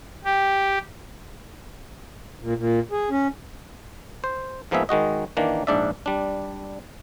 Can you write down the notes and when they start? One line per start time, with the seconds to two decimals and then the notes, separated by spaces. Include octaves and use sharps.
0.24 G4
2.42 A#2
2.57 A#2
2.91 G#4
3.10 C#4
4.24 C5
4.71 G#2 F3 A#3 B3 G#4 E5
4.89 D#3 G#3 F#4 D#5
5.37 D#3 E3 A#3 D4
5.67 A#1 G#2 D4 D5 E5
6.06 G3 D4